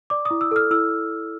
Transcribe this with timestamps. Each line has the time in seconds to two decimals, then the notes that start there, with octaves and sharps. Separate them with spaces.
0.10 D5 D6
0.25 D#6
0.31 E4
0.41 E6
0.51 A4 F6
0.71 E4 E6